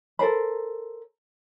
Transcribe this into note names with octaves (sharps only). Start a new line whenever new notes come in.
A4 A#4 C5 B5